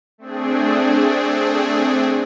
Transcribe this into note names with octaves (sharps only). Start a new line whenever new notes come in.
A3 C4 D4 G#4